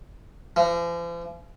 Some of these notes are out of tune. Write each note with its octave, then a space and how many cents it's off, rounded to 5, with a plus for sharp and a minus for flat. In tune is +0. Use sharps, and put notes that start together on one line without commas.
F3 -45